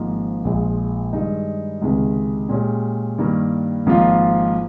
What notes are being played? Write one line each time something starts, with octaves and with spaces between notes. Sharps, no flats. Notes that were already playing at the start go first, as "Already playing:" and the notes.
Already playing: G#1 G#2 F3 A#3 D#4
A#1 A#2 F3 G#3
G2 D#3 G#3 D#4
C#2 C3 D#3 G#3
A#2 G#3 C#4 G4
G2 D#3 G3 A#3
G#1 G#2 F3 A#3 F4